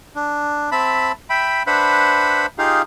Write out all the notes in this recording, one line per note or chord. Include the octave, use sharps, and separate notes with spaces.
D4
C4 E5 A5 B5
E5 G5 B5
D4 B4 C5 E5 F#5 B5
D#4 F4 G4 G#4 F5